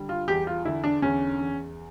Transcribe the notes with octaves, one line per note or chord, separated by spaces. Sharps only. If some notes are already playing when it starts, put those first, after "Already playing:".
Already playing: D3 G3
F4
E2 G4
F4
D3 E4
D4
E2 C#4
E2